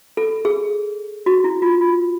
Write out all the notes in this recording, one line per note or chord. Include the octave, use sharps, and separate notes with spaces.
A4
G#4
F#4
E4
F4
F4